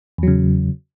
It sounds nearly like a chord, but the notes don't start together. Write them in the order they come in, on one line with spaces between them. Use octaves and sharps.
E2 F#3 C#3